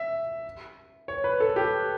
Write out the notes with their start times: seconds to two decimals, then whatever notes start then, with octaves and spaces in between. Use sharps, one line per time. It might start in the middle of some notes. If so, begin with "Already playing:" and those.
Already playing: E5
1.08 C#5
1.24 B4
1.40 A4
1.56 G4